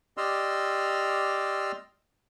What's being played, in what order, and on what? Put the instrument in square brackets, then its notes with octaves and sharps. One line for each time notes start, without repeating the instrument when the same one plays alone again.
[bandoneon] G4 D5 D#5 C6 E6 F6